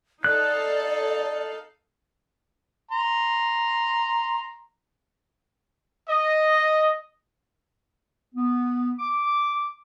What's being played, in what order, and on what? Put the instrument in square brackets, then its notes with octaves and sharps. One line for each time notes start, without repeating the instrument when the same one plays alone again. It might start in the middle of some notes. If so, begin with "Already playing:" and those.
[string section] D#4 A4 F5 [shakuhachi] D5 [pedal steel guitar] F#6
[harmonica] A#5 C6
[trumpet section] D#5
[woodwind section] B3
D6